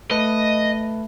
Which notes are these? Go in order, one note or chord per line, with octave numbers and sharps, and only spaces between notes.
A3 B4 D#5 A5